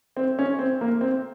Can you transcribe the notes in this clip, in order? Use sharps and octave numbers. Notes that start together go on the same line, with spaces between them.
C4
C#4
C4
A#3
C4